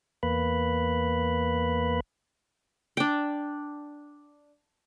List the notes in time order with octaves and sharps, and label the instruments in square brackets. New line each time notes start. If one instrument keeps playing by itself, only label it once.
[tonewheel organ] E2 A#3 B4 B5
[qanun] D4 G5